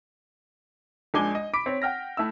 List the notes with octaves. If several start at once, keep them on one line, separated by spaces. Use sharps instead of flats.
A#1 G#3 D4 G#5 D6 G7
D#5
B5 D6 B6 D7
C4 C#5
F#5 G5 F6 A#6
A3 E4 E6